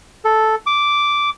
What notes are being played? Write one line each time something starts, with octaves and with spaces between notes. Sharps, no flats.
A4
D6